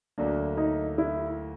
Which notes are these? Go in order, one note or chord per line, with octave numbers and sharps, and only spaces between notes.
D2 D3 F#3 A#3 D4
D#4
E4